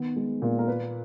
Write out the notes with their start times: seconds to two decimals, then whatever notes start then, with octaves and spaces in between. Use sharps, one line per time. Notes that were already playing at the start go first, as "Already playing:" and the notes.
Already playing: D#3 B3
0.16 G#3
0.42 A#2
0.59 A#4
0.68 A#3 B4